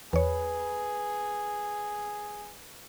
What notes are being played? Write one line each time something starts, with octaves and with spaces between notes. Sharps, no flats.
E2 G#4 B4 C#5